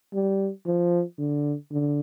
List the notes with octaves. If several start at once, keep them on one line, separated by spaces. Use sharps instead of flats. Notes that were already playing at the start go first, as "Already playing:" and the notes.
G3
F3
D3
D3